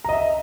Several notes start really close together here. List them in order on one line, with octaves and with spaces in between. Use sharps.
A#5 D#5 E5